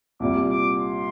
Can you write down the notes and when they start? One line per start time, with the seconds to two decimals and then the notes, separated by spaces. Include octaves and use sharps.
0.20 C2 A#2 G3 D6
0.50 D6
0.80 C6